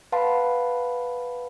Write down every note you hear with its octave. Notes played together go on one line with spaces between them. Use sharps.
B4 F5 F#5 A5 B5 C6